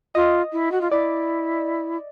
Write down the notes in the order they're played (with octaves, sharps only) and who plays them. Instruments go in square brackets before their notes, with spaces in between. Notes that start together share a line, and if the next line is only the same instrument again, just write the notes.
[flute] F4 [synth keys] D#5
[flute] E4
F#4
F4
[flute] E4 [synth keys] D5